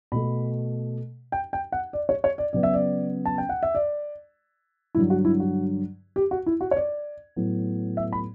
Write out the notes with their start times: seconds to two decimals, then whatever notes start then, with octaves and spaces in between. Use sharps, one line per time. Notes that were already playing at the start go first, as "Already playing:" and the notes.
0.12 B2 A3 B5
1.32 G5
1.53 G5
1.72 F#5
1.93 D5
2.09 C#5
2.24 C#5
2.38 D5
2.53 C#3 F#3 B3 D5
2.63 E5
2.74 D5
3.25 A5
3.38 G5
3.49 F#5
3.63 E5
3.75 D5
4.95 G2 D3 F#3 E4
5.10 F#4
5.25 E4
5.40 F#4
6.16 G4
6.31 F#4
6.46 E4
6.61 F#4
6.71 C#5
6.76 D5
7.36 A2 F#3 B3
7.97 E5
8.13 B5